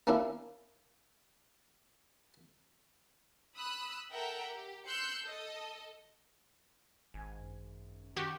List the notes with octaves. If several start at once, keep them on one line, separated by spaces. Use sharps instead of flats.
A#3 C#4 D4 E4
B5 D#6 E6 F#6
A4 A#4 E5 F#5 G5 A#5
G4
C6 E6 F#6 G6 C7 C#7
A4 D#5
G#1 G#5
F#2
D#3 C#4 F#4 G4 D6